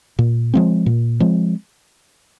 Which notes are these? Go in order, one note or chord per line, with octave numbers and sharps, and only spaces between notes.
A#2
F3 G#3 C4
A#2
F3 G#3 C4